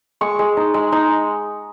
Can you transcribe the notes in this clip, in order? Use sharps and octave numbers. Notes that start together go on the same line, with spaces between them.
G#3 C#6
G#3
D#4
G#3
D#4